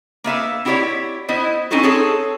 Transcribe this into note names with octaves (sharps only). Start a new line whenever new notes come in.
A#3 B3 E5 F5
C4 E4 F#4 G4 C#5 D5
B3 E4 C5 D#5
C4 C#4 D#4 E4 F#4 A4
C4 F#4 G#4 A4 C#5